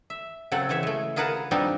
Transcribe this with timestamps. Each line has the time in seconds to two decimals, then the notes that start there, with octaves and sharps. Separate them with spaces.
0.10 E5
0.52 C#3 F#3 C4 A4 F#5
0.69 C#3 E3 C#5 E5
0.83 G#3 A3
1.16 F4 G#4 A#4 B4 F#5 A5
1.51 F3 G3 B3 C4 D4 D#4